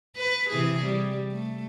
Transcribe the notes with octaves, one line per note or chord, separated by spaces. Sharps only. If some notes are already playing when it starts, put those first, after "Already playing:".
B4
C3 E3 G#4
G3
A3